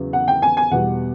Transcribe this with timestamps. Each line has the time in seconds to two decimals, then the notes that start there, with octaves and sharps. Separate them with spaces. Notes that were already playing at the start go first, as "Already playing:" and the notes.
Already playing: E2 C#3 F#3
0.13 F#5
0.28 G5
0.42 G#5
0.57 G#5
0.71 E2 B2 G3 F#5